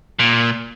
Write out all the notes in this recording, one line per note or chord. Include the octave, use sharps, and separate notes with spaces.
A#2